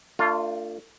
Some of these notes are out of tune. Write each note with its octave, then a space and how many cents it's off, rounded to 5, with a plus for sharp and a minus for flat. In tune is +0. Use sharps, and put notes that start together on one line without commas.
A3 +40 D4 +5 F4 +0